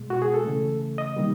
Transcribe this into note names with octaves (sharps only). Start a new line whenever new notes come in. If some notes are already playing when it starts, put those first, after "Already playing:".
Already playing: B2 G#3
F#4
G#4
A4
C#3 E3 A3
D#5
C3 D#3 G3 A#3